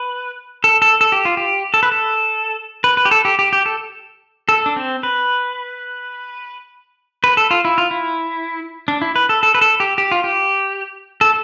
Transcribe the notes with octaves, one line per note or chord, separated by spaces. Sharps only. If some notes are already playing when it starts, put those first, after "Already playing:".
Already playing: B4
A4
A4
A4
G4
F4
G4
A4
B4
A4
B4
B4
G4
A4
G4
G4
G4
A4
A4
D4
C4
B4
B4
A4
F4
E4
F4
E4
D4
E4
B4
A4
A4
B4
A4
G4
G4
F4
G4
A4